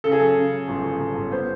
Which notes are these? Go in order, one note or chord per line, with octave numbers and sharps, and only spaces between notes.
C#3 A4
G#4
F#2 A4
C#3
C#3
G1
G1
G1
G1
B3 C5